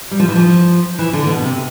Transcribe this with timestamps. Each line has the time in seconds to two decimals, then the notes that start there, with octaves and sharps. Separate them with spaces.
0.11 G3
0.20 F3
0.28 E3
0.35 F3
0.99 E3
1.13 D3
1.27 B2
1.43 C3